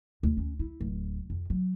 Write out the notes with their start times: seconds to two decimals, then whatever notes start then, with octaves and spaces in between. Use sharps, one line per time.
0.23 D2
0.37 C#4
0.59 E4
0.81 D1
1.30 F2
1.50 F#3